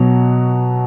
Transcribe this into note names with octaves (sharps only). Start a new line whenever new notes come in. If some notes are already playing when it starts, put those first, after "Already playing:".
Already playing: B2 F#3